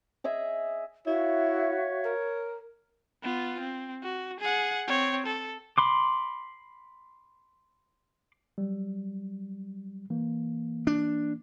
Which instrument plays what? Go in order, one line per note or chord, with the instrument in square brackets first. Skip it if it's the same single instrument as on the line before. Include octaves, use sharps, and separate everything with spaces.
[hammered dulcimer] G#4 D#5 E5 G#5
[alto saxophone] E4 [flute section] F#4 E5 F5 [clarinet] C#5
[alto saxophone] A#4
[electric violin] B3 F4
C4
F#4
G#4 F#5
C4 C#5
A4
[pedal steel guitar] B5 C6 D6
[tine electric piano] F#3 G3
E3 A#3
[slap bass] D4